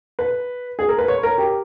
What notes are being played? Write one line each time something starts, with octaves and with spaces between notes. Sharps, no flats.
B4
G#4
A#4
B4
C#5
A#4
G4